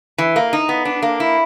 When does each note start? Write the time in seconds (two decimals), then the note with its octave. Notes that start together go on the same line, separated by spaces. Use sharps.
0.18 E3
0.36 A#3
0.53 D#4
0.69 B3
0.85 D4
1.02 A#3
1.20 E4